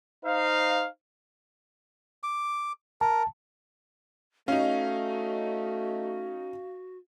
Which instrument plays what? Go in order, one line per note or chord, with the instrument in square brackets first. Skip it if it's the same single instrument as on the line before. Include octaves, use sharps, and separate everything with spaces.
[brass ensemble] D#4 C5 F5
[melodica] D6
[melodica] A#4 [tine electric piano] A5
[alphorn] A3 [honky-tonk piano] C#4 D#4 [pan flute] F#4 [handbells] F5